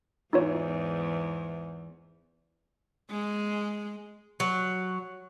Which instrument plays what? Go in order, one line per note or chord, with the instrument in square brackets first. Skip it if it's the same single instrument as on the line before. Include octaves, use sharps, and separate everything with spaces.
[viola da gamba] E2 G#2 [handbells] D#4 F4 C#5
[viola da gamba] G#3
[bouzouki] F#3